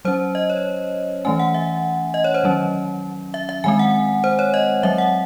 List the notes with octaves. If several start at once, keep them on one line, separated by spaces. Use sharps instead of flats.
F#3 C#4 C5
D#5
C#5
E3 A3 C#4 G#5
F#5
E5
D#5
C#5
C5
D#3 F#3 C#4
E5
E5
D#3 G#3 C4 G#5
F#5
C5
C#5
D#5
F#3 C4 E5
F#5